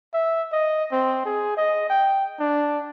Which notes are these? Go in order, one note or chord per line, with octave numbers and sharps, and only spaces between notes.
E5
D#5
C4
G#4
D#5
G5
D4